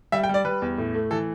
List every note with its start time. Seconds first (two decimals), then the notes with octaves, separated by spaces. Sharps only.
0.12 G3 E5
0.23 G5
0.29 G3
0.34 D5
0.45 G3 B4
0.62 E2
0.78 A2
0.94 A3
1.11 E3 A4